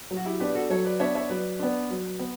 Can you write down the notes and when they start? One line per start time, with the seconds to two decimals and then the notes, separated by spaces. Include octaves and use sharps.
0.11 F#3
0.17 F#4
0.25 E4 G4
0.40 B3 D4 G4 B4
0.55 F#4 A4
0.70 F#3 A4 C#5
0.85 B4 D5
0.99 B3 D4 C#5 E5
1.15 C#5 E5
1.30 F#3 B4 D5
1.59 B3 D4
1.90 F#3
2.20 B3